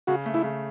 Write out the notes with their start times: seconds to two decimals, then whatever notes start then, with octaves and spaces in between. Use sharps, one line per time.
0.07 C#3 F#4
0.26 A3
0.34 E4
0.43 C#3